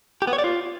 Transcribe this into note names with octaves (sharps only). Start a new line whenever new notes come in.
G4
B3
C#5
D5
F4